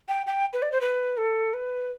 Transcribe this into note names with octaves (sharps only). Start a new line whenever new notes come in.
G5
G5
B4
D5
C5
B4
A4
B4